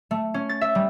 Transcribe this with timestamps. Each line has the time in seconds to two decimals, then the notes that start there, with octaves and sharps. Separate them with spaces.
0.11 A3
0.34 C#4
0.49 A6
0.61 E5
0.75 G3